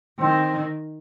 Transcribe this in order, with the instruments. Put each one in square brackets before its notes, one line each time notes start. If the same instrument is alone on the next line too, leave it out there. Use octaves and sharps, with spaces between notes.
[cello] D#3 [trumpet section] C4